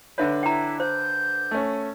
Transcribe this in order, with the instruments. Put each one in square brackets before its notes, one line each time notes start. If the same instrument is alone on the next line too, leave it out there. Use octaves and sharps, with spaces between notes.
[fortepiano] D3 D4 B4 [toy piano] C#5 E5
[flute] E4 [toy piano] G5 A#5
[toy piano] C5 [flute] G6
[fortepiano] A3 C#4